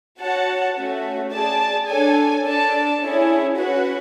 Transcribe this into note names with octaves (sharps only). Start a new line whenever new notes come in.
F#4 C#5 F#5 A5
A3 C#4 F#4
G#4 D5 A5
D4 A4 C#5 G#5
D4 A4 D5 A5
C#4 E4 G#4 C#5
C#4 F#4 B4 F#5